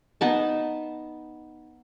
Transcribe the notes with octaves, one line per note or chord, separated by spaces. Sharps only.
B3 D#4 A5